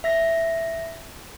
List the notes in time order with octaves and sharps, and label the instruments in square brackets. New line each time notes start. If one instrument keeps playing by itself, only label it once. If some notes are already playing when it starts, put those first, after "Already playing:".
[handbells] E5 A#6